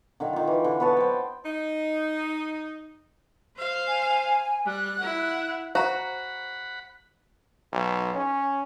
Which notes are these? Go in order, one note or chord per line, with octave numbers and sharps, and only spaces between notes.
D3 D#3 F5
D#3 F4
E3
D3
B3 B4 C#5 A5
C5 G5
D#4
C5 F5
G#5
G3 F#6
E4 F#5
F#4 C5 F#5 A#5 B5
B1
C#4